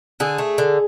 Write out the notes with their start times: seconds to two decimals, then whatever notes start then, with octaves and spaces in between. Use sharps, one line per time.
0.20 D3 G#4
0.38 A3
0.58 D3